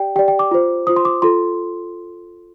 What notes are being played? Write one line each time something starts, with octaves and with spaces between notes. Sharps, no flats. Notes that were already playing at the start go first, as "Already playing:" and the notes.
Already playing: G4 D5 G5
G4 D5 G5
G5
D6
F4 C5
F4 C5 D#6
C6
D6
F4 A4 C6